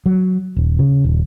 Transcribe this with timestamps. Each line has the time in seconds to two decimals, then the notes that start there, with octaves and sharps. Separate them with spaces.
0.06 F#3
0.56 D#1
0.79 C#3
1.04 D#1